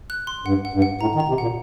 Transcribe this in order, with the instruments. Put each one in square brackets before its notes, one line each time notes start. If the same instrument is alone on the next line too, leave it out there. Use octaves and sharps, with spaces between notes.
[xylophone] F#6
C6
[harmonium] G2 [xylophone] F#5
[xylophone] F#5
[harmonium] G2
[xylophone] F#5
[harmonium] A2 [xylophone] A#5
[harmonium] D#3
[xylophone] A#5
[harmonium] C3
[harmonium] A#2 [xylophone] F#5